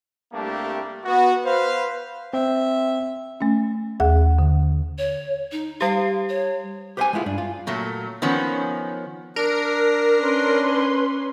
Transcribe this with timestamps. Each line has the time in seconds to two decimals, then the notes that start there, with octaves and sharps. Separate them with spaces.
0.33 C2 G3 A3 A#3 D4 G4
1.05 B3 F#4
1.46 B4 C5 F5
2.33 C4 E5
3.41 A3 C#4
4.00 D#2 G#4 F#5
4.38 D3
4.98 C#5
5.52 D#4
5.81 G3 G4 F5
6.29 C#5
6.97 G4 B4 C5 D#5 G5 G#5
7.13 G#3 A3 B3 D4 E4 F4
7.26 G2 D4
7.38 F4
7.67 A#2 F#3 A3
8.22 D#3 F3 B3 C#4
9.36 D4 A#4
10.19 C#4 B4 C6